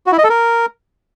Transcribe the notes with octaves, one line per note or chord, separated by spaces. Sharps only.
F#4
E4
D#5
A4
A#4